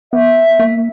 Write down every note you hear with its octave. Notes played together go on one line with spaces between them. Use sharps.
B3 E5
A#3